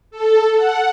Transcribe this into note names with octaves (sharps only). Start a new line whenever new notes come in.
A4
F#5